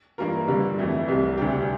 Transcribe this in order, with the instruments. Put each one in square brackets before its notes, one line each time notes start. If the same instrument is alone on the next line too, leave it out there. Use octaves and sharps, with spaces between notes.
[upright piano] G2 E3 A#3 F4 A#4
G2 D3 G3
F2 E3 A3 E4
C2 C3 G3
D2 C3 G3 D4 G4